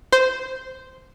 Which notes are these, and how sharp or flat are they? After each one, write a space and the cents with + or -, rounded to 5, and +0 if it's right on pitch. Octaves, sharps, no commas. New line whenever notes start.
C5 -10